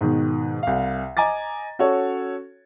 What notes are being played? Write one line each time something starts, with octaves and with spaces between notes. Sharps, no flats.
G#2 B2 D#3
C2 F5
D#5 G#5 A#5 D6 A6
C#4 F#4 A4 C#5